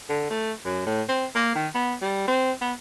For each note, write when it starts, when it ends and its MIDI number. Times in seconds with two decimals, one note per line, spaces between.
0.09 0.27 50
0.30 0.52 57
0.65 0.86 42
0.86 1.02 45
1.09 1.25 60
1.35 1.53 58
1.55 1.68 51
1.75 1.94 59
2.02 2.24 55
2.28 2.52 60
2.61 2.72 59